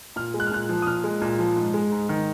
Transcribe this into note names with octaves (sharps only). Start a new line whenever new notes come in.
A#2 F6
G#3
F#6
F6
A#2 F#6
F3
D#6
A#2 F6
G#3
A#2
F3
G#2
G#3
G#2
D#3